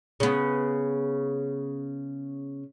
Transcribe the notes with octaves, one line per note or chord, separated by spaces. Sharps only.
C#3 B3